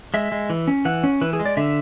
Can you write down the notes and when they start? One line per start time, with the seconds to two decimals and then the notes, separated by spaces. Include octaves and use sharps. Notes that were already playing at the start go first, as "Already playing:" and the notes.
0.14 G#3 E5
0.32 G#3
0.50 E3
0.68 C#4
0.85 E3 F#5
1.04 C#4
1.21 E3 B4
1.33 G#4
1.39 G#3
1.46 D5
1.57 D3 E5